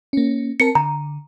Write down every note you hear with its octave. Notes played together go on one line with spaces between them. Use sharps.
A#3 C#4
C4 A#4 A5 C#7
D3 A#5